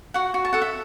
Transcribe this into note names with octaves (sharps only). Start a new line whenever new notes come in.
F#4 F#5
F#4
A5
A4 F#5
E5